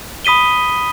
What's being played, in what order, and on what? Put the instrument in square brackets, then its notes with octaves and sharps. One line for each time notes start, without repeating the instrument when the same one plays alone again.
[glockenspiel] B5 D#6 B6 D#7 G7